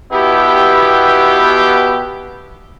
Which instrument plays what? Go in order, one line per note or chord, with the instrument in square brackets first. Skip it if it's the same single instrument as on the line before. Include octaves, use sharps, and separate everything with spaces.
[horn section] B2 B3 G4 [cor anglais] E4